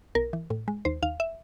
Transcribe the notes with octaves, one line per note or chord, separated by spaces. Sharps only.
B1 A#4
E3
A2
G#3
D#2 C5
D#2 F5
E5